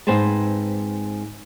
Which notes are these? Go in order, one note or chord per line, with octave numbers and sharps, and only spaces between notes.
G#2 C4 B4 C5 G#5 A5